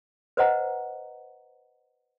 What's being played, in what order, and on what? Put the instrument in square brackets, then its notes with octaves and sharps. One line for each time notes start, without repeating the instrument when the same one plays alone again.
[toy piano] B4 C5 D#5 F#5 A#5